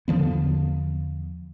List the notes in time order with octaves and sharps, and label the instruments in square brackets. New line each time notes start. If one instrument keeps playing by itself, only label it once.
[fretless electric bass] E2 D3 F3 B3